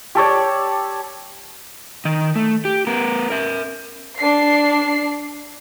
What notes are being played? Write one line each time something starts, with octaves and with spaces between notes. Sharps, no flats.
G4 A4 C#5 D5
D#3 D#5
A3
G4
B3 A#4
A#4 E5
D4 C7